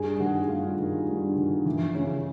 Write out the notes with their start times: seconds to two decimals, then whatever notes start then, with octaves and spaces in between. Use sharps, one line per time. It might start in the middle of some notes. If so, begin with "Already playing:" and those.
Already playing: G2 G#4
0.20 D#3 F#4
0.49 G2 F4
0.79 D#3
1.08 G2
1.36 D#3
1.66 E3
1.95 C#3